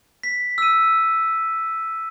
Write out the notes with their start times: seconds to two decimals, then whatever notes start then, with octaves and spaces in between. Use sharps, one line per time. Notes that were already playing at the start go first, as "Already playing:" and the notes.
0.23 B6
0.58 E6 D#7